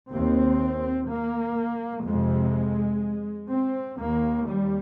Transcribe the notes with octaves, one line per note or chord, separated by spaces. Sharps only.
D#2 C4
A#3
F2 C3 G#3
C4
D#2 A#3
G3